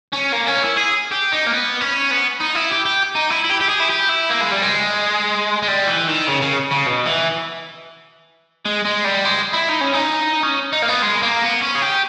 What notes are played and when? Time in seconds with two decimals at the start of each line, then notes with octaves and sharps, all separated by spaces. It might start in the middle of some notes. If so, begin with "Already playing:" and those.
0.13 C#4
0.32 A#3
0.47 C#4
0.63 E4
0.77 G#4
1.11 G4
1.32 D#4
1.46 A#3
1.52 B3
1.81 C#4
2.11 B3
2.41 D#4
2.55 E4
2.71 G4
2.86 G4
3.15 D#4
3.30 E4
3.44 E4
3.49 G4
3.60 G4
3.69 G#4
3.80 E4
3.89 G4
4.09 E4
4.29 A#3
4.40 G#3
4.51 G3
4.62 G#3
5.62 G#3
5.68 G3
5.87 E3
6.08 D#3
6.28 C#3
6.42 C#3
6.72 C#3
6.87 B2
7.06 E3
8.65 G#3
8.85 G#3
9.04 G3
9.25 G#3
9.54 E4
9.69 D#4
9.81 C#4
9.94 D#4
10.43 C#4
10.73 D#4
10.82 A#3
10.89 B3
11.02 G#3
11.22 A#3
11.43 B3
11.62 C#4
11.75 G#4
11.82 G4